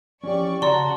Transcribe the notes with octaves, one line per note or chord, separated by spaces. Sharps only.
E2 F3 C#4 G4 D5 C#6
C#3 F#4 D5 F#5 A5 A#5 C6